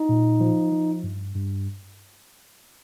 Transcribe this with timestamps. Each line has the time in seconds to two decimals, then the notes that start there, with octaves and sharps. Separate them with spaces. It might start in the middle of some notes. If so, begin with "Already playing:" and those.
Already playing: D#4
0.09 A#2
0.41 F3
0.72 F3
1.04 G2
1.35 G2